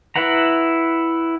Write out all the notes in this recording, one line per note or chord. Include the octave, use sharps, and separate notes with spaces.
E4 B4 F#5 A#5